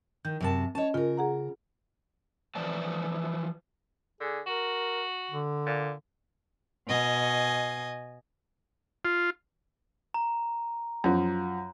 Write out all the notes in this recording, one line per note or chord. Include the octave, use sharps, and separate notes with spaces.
D#3 G6
F#2 C3 A5
C#4 C#5 D#5 A5
C#3 F4 A#4
G#4 F#5 A#5
E3 F3 D5 A5
D3 G#4
F#4 A#4
D3
A#2
B2 D#5 G#5
F4
A#5
F#2 F3